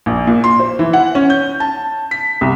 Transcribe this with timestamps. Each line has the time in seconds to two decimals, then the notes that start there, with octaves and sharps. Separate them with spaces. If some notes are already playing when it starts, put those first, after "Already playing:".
0.06 A#1
0.27 A#2
0.44 C6
0.60 C5
0.79 E3
0.93 F#5
1.15 C#4
1.30 G6
1.60 A5
2.11 B6
2.41 C2